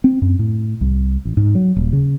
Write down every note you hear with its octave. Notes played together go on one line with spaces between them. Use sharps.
C4
F#2
A2
C2
A1
G#2
F#3
D#1
C#3